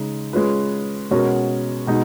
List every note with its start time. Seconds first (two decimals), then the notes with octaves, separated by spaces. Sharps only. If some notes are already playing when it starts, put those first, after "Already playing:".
Already playing: C#3 G#3 D#4
0.33 G#3 C#4 F4 B4
1.11 B2 G#3 C#4 F#4 A#4
1.87 B2 G#3 D#4